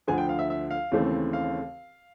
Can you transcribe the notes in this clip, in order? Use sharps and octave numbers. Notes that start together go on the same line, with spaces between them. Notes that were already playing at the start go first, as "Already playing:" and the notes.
D2 D3 F3 G#5
G5
F5
E5
E5
F5
D#2 C#3 E3 A3 C4
F5